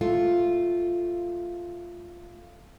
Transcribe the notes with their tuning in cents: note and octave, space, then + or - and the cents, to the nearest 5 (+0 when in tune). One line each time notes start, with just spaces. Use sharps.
A3 +0 F4 +0